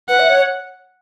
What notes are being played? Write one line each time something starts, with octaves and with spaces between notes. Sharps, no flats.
B4 F#5
E5
C#5